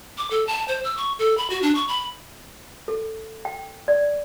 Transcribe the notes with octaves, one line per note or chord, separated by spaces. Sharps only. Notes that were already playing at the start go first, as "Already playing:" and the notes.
D6
A4
A5
C5
E6
C#6
A4
B5
F#4
D4
C#6
B5
A4
G5
D5